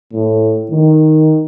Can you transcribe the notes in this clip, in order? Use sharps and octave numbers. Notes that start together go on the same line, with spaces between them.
A2
D#3